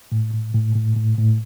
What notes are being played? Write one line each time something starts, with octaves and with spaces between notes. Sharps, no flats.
A2
A2
A2
A2
A2
A2